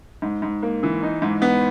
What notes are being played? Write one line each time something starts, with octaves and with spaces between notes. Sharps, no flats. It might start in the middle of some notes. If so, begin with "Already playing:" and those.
G#2
G#2
A#3
E3
D#4
G#2
B3